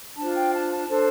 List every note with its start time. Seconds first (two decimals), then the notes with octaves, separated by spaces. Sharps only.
0.17 D4 F4 C5 A5
0.35 G5
0.53 A5
0.70 A5
0.87 D4 A4 C5